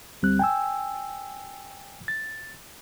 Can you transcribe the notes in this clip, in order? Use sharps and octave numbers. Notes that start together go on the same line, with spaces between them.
D2 G3 C4 F#6
G5 G#5 E6
A6